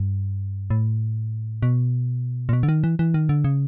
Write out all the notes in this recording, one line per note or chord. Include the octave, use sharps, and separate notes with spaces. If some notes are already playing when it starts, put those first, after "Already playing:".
Already playing: G2
A2
B2
A#2
B2
D3
D#3
E3
E3
D#3
D3
C#3